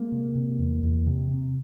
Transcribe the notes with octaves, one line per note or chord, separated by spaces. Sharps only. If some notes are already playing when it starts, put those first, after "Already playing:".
Already playing: G#3 A#3
C3
C3
E2
E2
C3
C3